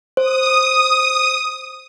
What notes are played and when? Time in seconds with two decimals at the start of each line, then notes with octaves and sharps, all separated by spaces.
0.17 C5 D#6